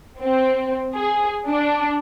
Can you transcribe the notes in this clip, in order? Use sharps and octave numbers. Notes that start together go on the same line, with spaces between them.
C4
G#4
D4